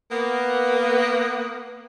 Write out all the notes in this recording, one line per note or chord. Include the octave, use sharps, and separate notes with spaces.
A#3 B3